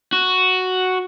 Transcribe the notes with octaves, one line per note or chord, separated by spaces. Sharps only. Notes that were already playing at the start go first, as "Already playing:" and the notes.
F#4